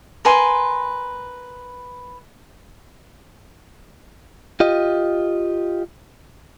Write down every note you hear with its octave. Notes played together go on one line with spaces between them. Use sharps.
A#4 B4 G#5 C6
F4 G4 D#5